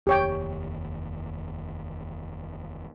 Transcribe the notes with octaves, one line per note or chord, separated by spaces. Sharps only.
F1 D#2 G4 C#5 G5